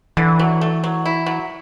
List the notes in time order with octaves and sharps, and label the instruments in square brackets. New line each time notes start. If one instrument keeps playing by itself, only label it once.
[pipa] D3 [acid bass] E3
[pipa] F#3
A3
F#3
E4
F#3